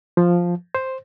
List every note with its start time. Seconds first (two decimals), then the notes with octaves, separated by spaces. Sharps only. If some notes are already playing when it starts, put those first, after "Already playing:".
0.17 F3
0.75 C5